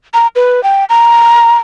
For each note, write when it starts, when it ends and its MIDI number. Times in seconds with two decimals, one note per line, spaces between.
0.14 0.27 82
0.36 0.63 71
0.63 0.84 79
0.89 1.56 82